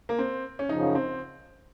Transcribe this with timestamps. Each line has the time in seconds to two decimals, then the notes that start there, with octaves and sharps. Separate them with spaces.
0.09 A#3
0.18 C4
0.59 C#4
0.69 F#2 C#3 F3 D#4
0.95 C4